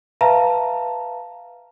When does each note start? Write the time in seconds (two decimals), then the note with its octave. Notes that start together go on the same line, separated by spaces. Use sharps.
0.21 B4 E5 F5 A5 A#5